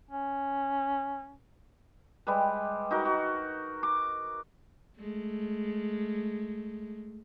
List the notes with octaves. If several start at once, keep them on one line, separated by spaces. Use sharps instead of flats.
C#4
G3 G#3 G4 B4
D#4 F#4 A#4
F#4
D6
G#3 A3